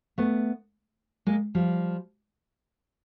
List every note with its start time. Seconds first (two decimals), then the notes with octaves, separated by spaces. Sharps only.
0.18 A3 B3
1.27 G#3 A#3
1.55 F3 G3